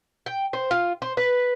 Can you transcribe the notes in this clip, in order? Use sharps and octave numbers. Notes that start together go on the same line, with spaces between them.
G5
C5
F4
C5
B4